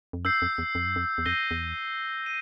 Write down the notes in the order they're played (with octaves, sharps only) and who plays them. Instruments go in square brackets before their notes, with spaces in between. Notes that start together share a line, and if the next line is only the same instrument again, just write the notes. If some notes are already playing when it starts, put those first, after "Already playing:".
[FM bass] F2
[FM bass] F#2 [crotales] E6 G6 C7
[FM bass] F2
E2
F2
F#2
F2
E2
[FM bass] F2 [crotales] G6 A#6 D#7 G7
[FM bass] E2
[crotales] D#7